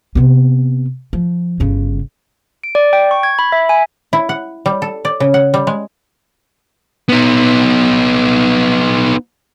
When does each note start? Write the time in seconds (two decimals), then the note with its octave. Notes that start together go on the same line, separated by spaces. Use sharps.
0.15 C3 B3
1.13 F3
1.60 G1 C#3
2.64 D7
2.75 D5
2.93 G5
3.11 C#6
3.23 G#6
3.39 B5
3.52 E5
3.69 G#5
4.13 E4
4.29 F#5
4.66 G3
4.82 A4
5.05 D5
5.20 C#3
5.34 F#5
5.54 G3
5.67 G#3
7.09 B3 D#4